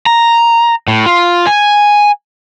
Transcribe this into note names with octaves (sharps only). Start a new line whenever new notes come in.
A#5
A2
F4
G#5